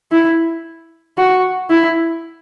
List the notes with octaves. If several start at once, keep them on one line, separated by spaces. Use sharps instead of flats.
E4
F#4
E4